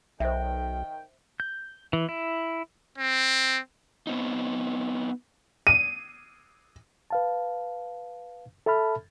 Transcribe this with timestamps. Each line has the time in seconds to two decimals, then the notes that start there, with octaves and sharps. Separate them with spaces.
0.20 B1 D#3 C5 E5 G5
1.40 G6
1.93 E3
2.09 E4
2.98 C4
4.07 B3 C4 D#4
5.67 D#7
7.10 B4 F5 A5
8.66 A4 E5 A5 B5 F6